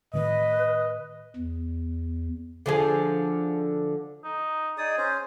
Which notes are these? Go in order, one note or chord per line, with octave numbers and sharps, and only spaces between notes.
A2 D#3 A3 B4 D#5
E2
D3 F3 G#4
D#4
D#4 G#4 D5 D#6
C#4 C5